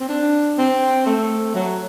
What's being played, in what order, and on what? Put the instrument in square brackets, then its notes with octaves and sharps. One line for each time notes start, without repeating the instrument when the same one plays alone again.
[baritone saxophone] C4
D4
C4
A3
F#3